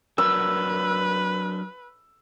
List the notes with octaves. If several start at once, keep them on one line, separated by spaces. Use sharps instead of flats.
F#3 D4 A#4 B4 E6